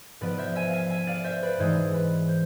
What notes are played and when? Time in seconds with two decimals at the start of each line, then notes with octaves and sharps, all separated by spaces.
0.21 G#2 F3 B3 B4 D5
0.38 C5 E5
0.55 E5 G#5
0.69 E5 F5 G#5
0.90 E5 G#5
1.07 D5 F5
1.24 C5 E5
1.43 B4 D5
1.59 G#2 E3 G#3 C5
1.94 B4
2.29 C5